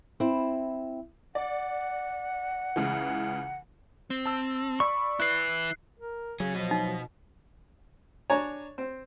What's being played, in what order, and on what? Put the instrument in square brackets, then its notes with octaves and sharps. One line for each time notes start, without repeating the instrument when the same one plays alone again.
[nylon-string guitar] C4 E4
[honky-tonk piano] D5 [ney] F#5
[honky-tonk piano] C#2 C#3 E3
[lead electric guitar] C4
[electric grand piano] A5 E6
[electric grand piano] D5 B5 E6 [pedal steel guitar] C#6
[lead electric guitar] E4 B4 [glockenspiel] F#6 C7
[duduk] A#4
[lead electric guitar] C#3 G#4 [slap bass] F#3
[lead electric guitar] B2 D#5 [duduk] F3
[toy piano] D#4
[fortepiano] D4 C#5 G#5 A#5
C4